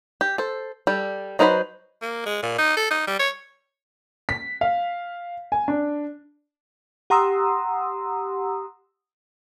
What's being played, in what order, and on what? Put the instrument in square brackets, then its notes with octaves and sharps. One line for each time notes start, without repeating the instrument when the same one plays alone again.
[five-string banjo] G4
A4 C5
G3 G4 A4
F#3 D#4 B4 C5 B5
[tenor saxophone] A#3
G#3
A#2
D#4
A4
D#4
G3
C#5
[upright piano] B6
F5
G#5
D4
[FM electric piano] G4 F#5 A#5 C6 D#6 E6